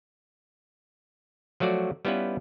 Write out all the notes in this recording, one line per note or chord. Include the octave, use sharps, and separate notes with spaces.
F3 F#3 A3 F#4 D5
G3 B3 C#4 E4 F4 B4